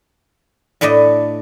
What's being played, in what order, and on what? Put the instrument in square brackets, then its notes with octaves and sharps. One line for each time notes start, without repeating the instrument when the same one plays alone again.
[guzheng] A2 A3 D4 D5 D#5